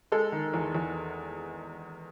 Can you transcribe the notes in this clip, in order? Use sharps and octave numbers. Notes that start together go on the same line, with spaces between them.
G#3 A4
D#3
E2
E2